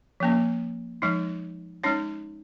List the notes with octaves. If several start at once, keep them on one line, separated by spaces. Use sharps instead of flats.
F3 A#3 C#4
F3 G#3 D#4
G#3 C#4 D#4 C#5